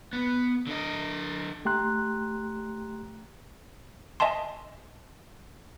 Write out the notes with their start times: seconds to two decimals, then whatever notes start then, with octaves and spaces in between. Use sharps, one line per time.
0.13 B3
0.67 D3 D#5
1.65 A3 G4 G5 A#5 C6 F#6
4.20 D#5 E5 G#5 A5 C6